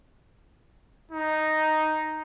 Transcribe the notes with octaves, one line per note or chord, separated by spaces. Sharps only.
D#4